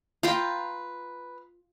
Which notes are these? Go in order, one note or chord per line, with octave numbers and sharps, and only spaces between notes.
F4 B4 F5 G5 A#5